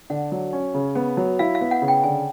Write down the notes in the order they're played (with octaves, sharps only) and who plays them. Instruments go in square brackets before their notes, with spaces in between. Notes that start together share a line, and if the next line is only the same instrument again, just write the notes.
[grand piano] D3 [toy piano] F#5
[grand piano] F#3
C#4
C#3
B3
F#3
[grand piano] E4 [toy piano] F5
[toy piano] F5
[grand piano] B3
[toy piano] F#5
[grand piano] C#3
[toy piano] G5
[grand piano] D3 [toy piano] G#5